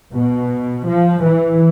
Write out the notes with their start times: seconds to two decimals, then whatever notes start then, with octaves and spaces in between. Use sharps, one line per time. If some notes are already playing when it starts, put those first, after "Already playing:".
0.13 B2
0.87 F3
1.25 E3